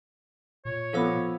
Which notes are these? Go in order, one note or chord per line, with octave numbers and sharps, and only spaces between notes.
A#2 C#5
F3 B3 A4 F5 E6